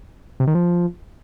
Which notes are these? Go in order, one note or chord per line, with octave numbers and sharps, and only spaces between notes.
C3
D#3
F3